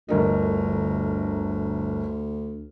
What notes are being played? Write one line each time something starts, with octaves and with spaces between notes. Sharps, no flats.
G1 D2 A#4 D#5